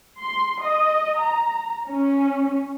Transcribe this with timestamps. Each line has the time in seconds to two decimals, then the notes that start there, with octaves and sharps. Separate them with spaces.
0.19 C6
0.62 D#5
1.19 A#5
1.88 C#4